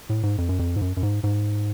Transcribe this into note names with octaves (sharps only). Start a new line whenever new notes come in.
A2
G#2
F2
F#2
F2
G#2
F#2
F#2
G#2
G#2